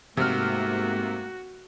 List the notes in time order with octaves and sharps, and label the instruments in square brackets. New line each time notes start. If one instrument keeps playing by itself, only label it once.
[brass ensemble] G#2 A3 A#3 [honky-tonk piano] C3 F6 [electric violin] F#4